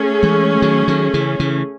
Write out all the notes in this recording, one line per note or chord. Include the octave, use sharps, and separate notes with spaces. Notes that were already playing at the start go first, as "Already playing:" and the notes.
Already playing: A3 C#4 G#4
E3 G#3
D#3 F#3
D#3 F#3
C#3 E3
C#3 E3